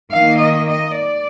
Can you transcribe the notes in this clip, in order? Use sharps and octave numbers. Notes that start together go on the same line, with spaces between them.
D#3 A#3 F5
D#5
D#5
D5